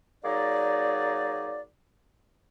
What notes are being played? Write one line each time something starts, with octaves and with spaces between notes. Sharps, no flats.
F#3 A#3 D#4 G#4 D5